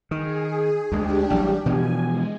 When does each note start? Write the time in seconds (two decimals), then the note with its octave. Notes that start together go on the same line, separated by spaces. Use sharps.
0.11 D#3 G#4
0.92 D2 G#3 D4 G4
1.30 A1 F#3 G3
1.66 B2 E3 F3 G#5
2.03 G#3